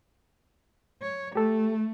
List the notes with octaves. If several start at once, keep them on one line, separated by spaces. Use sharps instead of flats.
C#5
A3 G4 A4